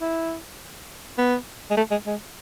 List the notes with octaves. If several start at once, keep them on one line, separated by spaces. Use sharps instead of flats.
E4
B3
G#3
A3
G#3
G#3